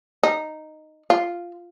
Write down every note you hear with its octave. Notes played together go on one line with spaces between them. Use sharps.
D#4
F4